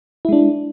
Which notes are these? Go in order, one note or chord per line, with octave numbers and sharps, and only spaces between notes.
G#3 D4 E4